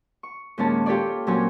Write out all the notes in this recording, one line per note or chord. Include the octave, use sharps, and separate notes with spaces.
C#6
D#2 A#2 G#3 C#4 C#5 A5
F4 G4 A4 C#5 D5
A#2 F#3 C4 C#4 C#5 G#5